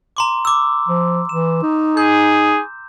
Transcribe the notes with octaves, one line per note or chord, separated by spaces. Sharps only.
A#5 C6 D6
D6 E6
F3
E3 E7
D#4
G#4 G6